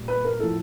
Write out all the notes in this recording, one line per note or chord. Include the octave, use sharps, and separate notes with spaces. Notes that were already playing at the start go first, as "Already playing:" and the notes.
Already playing: A#2 G3
B4
A#4
A2 F3 A4